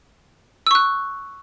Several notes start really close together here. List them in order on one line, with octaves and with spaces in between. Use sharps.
E6 C#6 F#6